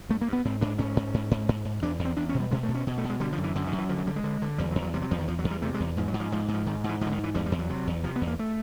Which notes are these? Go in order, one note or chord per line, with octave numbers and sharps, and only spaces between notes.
G2 A3
A#3
G2
B3
G#2 C4
G#2 D4
G#2 C#4
G#2
G#2
G#2
G#2
G#2
E2 D4
E2
C4
E2 D4
C#4
B2
G3
B2 G#3
A3
B2
C#4
B2
A3
B2
G#3
D3 G3
F3
F#2
E3
F#2 D3
D#3
F#2
E3
D3 F3
F#3
D3 G3
G#3
D3
D3
E2 G3
F#3
E2
F#3
C3 G3
F#3
E2 F3
D#3
E2 F3
F#3
E2
G3
C3 A3
G#3
E2
G#2 F3
F#3
G#2
F3
G#2 F3
G#2
F3
G#2 D#3
G#2
E3
G#2 F3
D3
D#3
G#2
E3
E2 G3
G3
E2
F#3
C3
E2
C3 F3
B3
E2
A#3
A3